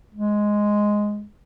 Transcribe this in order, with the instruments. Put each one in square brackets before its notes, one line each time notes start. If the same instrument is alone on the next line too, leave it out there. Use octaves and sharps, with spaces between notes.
[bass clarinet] G#3